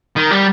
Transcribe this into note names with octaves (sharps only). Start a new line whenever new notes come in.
D#3
G3